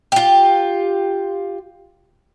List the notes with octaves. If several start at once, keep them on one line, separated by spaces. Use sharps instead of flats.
F4 G4